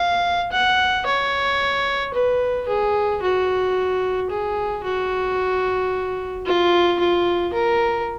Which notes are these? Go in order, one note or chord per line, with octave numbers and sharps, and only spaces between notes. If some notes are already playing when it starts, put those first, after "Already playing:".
Already playing: F5
F#5
C#5
B4
G#4
F#4
G#4
F#4
F4
F4
A#4